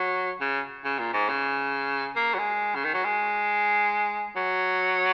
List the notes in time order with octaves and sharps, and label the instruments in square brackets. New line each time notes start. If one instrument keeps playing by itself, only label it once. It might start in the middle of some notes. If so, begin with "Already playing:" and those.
Already playing: [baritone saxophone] F#3
C#3
C#3
A#2
G#2
C#3
A#3
F#3
G#3
C#3
D#3
F#3
G#3
F#3